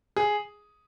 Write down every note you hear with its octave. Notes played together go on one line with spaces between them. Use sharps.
G#4